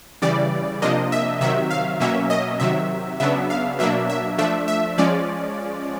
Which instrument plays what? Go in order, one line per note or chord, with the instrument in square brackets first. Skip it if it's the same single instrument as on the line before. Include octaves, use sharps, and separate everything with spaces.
[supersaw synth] C#3 E3 G3 D5
C3 F3 A#3 D4 D#5
E5
C3 D#3 F#3 E5
F5
B2 F#3 A#3 C#4 E5
D#5
C3 D#3 F#3 E5
C#3 F#3 B3 D4 E5
F5
B2 F#3 A#3 D4 E5
E5
F3 A3 D4 E5
E5
F3 G#3 C#4 D5